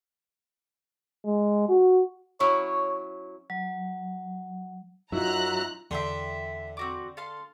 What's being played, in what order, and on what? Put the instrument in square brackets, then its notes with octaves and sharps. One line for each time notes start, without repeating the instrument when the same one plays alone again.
[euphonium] G#3
F#4
[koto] F#3 C#4 E4 [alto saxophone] C#5
[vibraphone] F#3
[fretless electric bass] F#2 [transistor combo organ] F#3 E5 [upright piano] D#4 F4 [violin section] A#5 F#6
[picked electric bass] E2 [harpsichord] D3 [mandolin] E5 G5 C6
[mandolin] C4 F#4 D6
A4 F5 C6